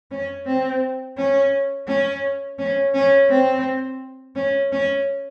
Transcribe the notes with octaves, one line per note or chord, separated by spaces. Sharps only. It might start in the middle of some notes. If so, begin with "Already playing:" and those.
C#4
C4
C#4
C#4
C#4
C#4
C4
C#4
C#4